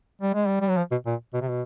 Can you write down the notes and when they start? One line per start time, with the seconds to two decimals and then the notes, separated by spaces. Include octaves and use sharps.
0.21 G3
0.34 G#3
0.47 G3
0.61 G3
0.69 F#3
0.77 F3
0.91 B2
1.06 A#2
1.34 B2
1.41 C3
1.50 B2